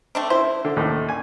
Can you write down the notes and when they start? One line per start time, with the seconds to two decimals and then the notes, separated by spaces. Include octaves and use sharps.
0.15 A3 C4 D4
0.30 E4 C5
0.65 D3
0.77 D#2 A2
1.08 G#5